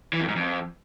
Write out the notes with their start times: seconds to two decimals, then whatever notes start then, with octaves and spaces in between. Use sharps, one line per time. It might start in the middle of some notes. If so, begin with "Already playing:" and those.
0.13 E3
0.21 F2
0.28 G#2
0.36 F2